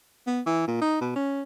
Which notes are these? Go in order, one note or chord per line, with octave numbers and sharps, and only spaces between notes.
B3
E3
A#2
D#4
B2
C#4